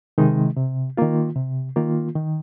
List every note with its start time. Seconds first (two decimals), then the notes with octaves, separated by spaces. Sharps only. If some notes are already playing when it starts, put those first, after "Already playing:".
0.18 C3 D#3 G#3 D#4
0.57 C3
0.97 D#3 A#3 F4
1.36 C3
1.76 D#3 A#3 F4
2.15 D#3